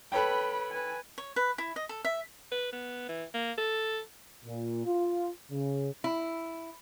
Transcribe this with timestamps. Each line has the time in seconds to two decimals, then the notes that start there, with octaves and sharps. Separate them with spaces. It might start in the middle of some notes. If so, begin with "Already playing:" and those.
0.12 A4 B4 C#5 G5 B5
0.70 B4 G#5
1.18 C#5
1.36 B4
1.58 E4
1.76 D#5
1.89 A4
2.05 E5
2.52 B4
2.72 B3
3.09 E3
3.34 A#3
3.58 A4
4.45 A#2
4.86 F4
5.51 C#3
6.04 E4